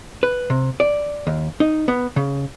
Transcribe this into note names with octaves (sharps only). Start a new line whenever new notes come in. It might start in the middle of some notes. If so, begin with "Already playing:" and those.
B4
C3
D5
D#2
D#4
B3
C#3